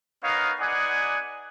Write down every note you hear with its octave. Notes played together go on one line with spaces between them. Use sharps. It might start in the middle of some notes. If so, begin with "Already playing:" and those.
B3 D#4 A#4 C#5 F5
B3 D#4 G#4 D5 F#5 G#5